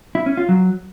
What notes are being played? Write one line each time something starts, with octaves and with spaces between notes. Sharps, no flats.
E4
C#4
F4
F#3